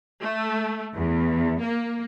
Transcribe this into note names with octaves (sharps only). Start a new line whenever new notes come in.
A3
E2
A#3